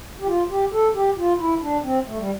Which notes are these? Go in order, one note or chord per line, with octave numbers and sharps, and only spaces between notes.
G4
F4
G4
A4
G4
F4
E4
D4
C4
A3
G3